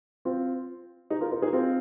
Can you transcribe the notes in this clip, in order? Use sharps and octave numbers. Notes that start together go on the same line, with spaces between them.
C4 F4
D#4 G#4
F4 A#4
F4 A#4
D#4 G#4
C4 F4